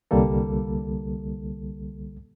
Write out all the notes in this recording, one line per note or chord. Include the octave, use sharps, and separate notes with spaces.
C2 D3 G3 A#3 A4